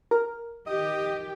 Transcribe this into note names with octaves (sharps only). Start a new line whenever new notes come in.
A#4
D#3 G4 D#5